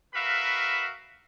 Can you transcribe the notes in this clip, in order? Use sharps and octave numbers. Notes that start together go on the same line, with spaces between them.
F#4 A#4 B4 E5 F5 B5